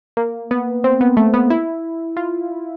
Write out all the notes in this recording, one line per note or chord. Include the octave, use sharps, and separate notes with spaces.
A#3
B3
C4
B3
A3
B3
E4
F4